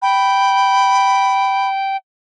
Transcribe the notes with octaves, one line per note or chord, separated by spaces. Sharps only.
G5 B5